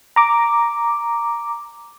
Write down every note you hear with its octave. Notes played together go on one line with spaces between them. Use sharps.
A#5 D6